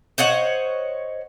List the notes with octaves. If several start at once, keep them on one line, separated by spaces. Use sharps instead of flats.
C5 C#5 D#5 F#5